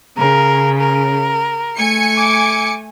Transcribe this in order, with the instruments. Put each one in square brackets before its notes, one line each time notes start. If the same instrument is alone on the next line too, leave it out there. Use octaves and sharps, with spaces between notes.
[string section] C#3 [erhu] A#4
[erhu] A#4
[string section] A3 G#5 C#7
[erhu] D6